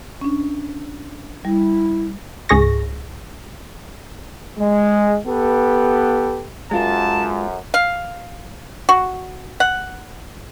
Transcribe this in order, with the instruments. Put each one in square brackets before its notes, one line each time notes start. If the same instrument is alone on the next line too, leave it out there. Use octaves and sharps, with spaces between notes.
[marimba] C#4 D4
[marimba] G3 [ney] E4
[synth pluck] C#2 G#2 G#4 C#6 A#6
[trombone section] G#3
B3 G4 A4 B4
[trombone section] B1 F#2 [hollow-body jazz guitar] G#3 F4 A#4 [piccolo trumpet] A5
[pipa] F5
F#4
F#5